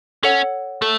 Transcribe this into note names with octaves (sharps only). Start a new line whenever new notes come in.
C#4 A4 C#5 F#5
A3 A4